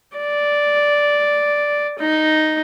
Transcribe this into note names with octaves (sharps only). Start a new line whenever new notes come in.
D5
D#4